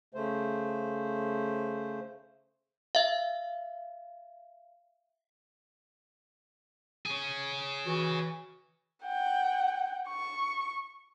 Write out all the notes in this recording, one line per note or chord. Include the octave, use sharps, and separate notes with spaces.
C#3 A3 C5
E5 F5
G#4 C#5
E3 F#4
F#5 G5
C#6